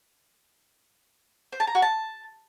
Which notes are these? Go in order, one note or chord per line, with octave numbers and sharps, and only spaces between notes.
C5
A5
A#5
F#4
A5